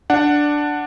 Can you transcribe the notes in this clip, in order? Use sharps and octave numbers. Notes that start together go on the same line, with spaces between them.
D4 F#5